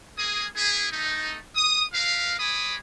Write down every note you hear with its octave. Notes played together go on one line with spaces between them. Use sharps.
A#3 G#4 D#6
B3 E4 G#4
A3 D#4
D#6
E4 A#4 B4 F5
G#3 C#5 G#5 B5 D6 D#6